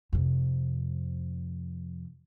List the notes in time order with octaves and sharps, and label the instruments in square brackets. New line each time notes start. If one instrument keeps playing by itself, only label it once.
[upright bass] F2 C3